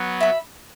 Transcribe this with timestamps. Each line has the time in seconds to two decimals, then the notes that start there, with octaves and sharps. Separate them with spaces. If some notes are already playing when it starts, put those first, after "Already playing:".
Already playing: F#3 B3
0.21 E5 B5